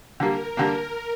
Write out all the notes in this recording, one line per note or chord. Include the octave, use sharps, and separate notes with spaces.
D3 G3 A#3 A#4
D3 G3 A#3